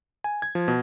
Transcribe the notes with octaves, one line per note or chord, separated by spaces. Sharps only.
G#5
G#6
F3
B2